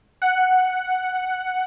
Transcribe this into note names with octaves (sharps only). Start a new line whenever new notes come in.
F#5